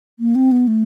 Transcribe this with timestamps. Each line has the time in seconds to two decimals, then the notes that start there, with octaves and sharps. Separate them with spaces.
0.19 A#3
0.35 C4
0.52 B3
0.67 A3